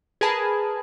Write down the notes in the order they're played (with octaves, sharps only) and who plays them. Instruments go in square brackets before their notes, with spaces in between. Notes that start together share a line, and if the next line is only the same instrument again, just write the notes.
[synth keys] G#4 A#4 B4 G#5 A5 B5